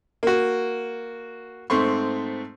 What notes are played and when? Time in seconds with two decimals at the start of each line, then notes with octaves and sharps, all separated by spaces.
0.23 A#3 F#4
1.70 G#2 A3 C4 C6 C#6